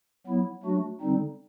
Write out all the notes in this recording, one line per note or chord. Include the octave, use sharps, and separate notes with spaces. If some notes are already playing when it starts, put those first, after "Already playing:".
F#3 B3 E4
F#3 A3 D4 F#4
D3 G3 C4 D#4